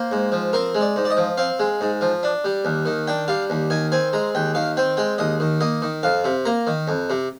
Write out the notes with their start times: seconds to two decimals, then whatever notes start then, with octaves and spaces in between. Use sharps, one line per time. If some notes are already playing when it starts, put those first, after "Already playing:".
Already playing: A#3 C5
0.12 G#2
0.32 F3
0.53 C4 A#4
0.75 G#3
0.81 D5
0.96 G#2
1.05 D5
1.10 D#5
1.17 F3
1.37 C4 F5
1.59 G#3
1.81 G#2
2.01 F3
2.23 D4
2.44 G3
2.65 D#2
2.86 D#3
3.07 D4 G5
3.28 G3 F5
3.50 D#2
3.70 D#3 G#5
3.92 C4 G#5
4.13 G#3 A#5
4.35 D#2 G5
4.55 D#3 F5
4.77 C4 G5
4.97 G#3 G5
5.18 D#2 D#5
5.40 D#3
5.61 A#3 D#5
5.82 D#3
6.03 F2 F5
6.25 C3
6.45 A#3 A#5
6.67 D#3
6.88 F2
7.10 C3